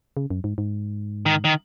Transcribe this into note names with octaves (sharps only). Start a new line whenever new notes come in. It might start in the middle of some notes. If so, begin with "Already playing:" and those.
C#3
F#2
G#2
G#2
D#3
D#3